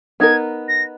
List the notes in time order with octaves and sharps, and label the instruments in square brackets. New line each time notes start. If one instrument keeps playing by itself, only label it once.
[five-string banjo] B3 D#4 A#4 [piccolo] G#6
[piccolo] A#6